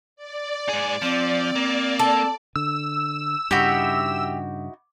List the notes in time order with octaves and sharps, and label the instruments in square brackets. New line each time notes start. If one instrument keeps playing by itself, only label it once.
[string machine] D5
[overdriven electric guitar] G#2 G#4
[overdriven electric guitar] F3 [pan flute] C4
[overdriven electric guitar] A#3
[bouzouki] A4
[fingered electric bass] D3 [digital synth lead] E6
[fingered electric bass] G2 C#3 [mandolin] D#4 E4 F#4 [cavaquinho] G4